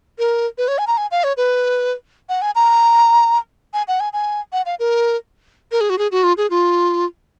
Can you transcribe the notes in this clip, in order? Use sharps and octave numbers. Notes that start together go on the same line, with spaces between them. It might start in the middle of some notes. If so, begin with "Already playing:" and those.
A#4
B4
C#5
G#5
A#5
G#5
F5
C#5
B4
F#5
G#5
A#5
G#5
F#5
G#5
G#5
F#5
F5
A#4
A#4
G#4
F#4
G#4
F#4
F4
G#4
F4